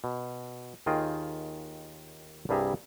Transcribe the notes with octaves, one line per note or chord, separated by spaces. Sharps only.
B2
D#2 D#3 F4 G#4 D#5 G5
C2 G2 G3 G#4 E5 A#5